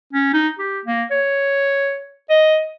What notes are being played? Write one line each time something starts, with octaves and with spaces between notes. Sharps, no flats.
C#4
D#4
G4
A#3
C#5
D#5